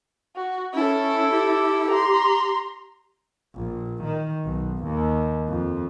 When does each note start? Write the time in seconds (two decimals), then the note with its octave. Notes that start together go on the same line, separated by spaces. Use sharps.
0.36 F#4
0.74 C#4 E4 A4
1.31 G4
1.90 A#5 C6
3.55 A#1
4.03 D#3
4.45 B1
4.84 D#2
5.48 F2